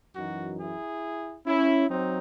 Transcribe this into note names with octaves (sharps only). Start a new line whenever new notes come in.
F#2 E3 D#4 F#4
E4 G#4
C#4 E4
F#3 C4 D#4